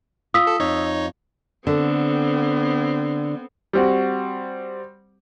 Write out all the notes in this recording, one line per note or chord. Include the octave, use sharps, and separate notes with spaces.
F4 D#6 E6 B6
A4
F2 D#4 C#5
D3 B3 C4
G3 C4 F#4